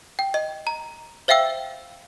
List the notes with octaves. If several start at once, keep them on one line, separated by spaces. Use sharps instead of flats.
G5
D#5
A#5
C5 E5 F5 G5 E6